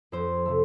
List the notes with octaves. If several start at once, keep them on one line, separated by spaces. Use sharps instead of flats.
F2 C5
C3 F3 A3